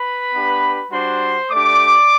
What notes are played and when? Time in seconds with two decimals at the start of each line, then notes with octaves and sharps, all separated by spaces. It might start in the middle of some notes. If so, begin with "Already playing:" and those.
Already playing: B4 B5
0.33 B3 D4 G4
0.91 G3 D4 F#4 C5 C6
1.51 A3 D4 G4 D5 D6